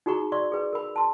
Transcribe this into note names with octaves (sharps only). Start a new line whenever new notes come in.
D#4 F#4 G#4 A#5 C#6
D5 C6 C#6
G#4 B4
A#4 B5
A5 C6